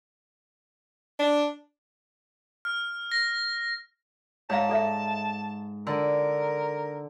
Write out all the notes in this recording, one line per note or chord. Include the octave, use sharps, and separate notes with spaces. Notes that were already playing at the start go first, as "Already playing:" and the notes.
D4
F6
A#6
G#2 C#5 D5 F5 A5 A#5
A4 D5 E5
D3 A#4